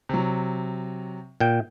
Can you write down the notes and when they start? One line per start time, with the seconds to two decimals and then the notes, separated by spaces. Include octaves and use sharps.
0.09 C3 F#3
1.40 A#2 G5